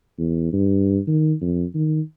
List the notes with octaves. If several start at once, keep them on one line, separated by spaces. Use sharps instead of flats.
E2
G2
D#3
F2
D#3